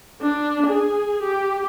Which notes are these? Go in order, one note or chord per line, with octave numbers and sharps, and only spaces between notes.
D4
G#4
G4